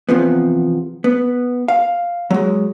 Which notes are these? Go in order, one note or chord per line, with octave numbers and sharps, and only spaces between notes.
E2 C3 F3 B3
B3
F5
F#3 G#3